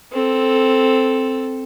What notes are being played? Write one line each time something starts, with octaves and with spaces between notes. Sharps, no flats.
C4 A4